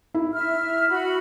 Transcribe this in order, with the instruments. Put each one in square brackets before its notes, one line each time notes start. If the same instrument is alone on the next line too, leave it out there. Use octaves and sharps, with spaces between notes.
[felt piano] E4
[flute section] E5 F6
F#4 B5